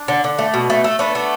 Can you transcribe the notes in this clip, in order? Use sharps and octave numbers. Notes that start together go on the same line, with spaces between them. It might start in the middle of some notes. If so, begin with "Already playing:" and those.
Already playing: D4
D3
D3
A3
B2
A3
A3
A3 B3 D4
A3